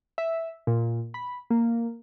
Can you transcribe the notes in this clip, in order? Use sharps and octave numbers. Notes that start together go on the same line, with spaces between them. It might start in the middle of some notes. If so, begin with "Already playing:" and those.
E5
A#2
B5
A#3